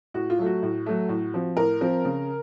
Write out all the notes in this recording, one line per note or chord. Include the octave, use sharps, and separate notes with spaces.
A2 F#4
F4
F#3 A3
F#4
A2
F#3 A3
A2
F3 C4
A2 A#4
F3 C4
C#3